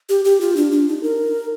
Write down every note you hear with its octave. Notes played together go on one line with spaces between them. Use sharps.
G4
G4
F4
D4
D4
D#4
A#4